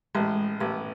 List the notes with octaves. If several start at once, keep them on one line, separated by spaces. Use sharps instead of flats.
A1 G#3
A1 B3